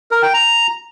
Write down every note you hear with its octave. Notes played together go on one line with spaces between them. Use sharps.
A#4
G5
A#5